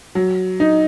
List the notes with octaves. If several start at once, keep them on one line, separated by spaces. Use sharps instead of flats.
F#3
D#4